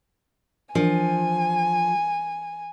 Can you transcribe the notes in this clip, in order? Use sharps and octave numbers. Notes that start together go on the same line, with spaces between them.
E3 F3 D4 A#4 G#5